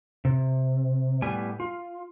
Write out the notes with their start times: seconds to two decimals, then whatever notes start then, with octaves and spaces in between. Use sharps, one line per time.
0.25 C3
1.22 A2 G3 B3 G#5
1.60 F4